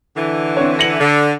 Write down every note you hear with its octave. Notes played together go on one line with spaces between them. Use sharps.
D3 E3
C4 D4 C#5
A#6 C#7 F#7
D3